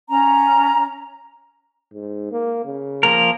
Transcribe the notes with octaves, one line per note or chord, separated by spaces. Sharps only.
C#4 A#5
G#2
A#3
C#3
F3 A#3 A#4